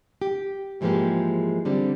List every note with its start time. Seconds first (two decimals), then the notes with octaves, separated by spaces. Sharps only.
0.22 G4
0.81 G#2 E3 F3 G#3 A#3 G4
1.65 D3 G3 C4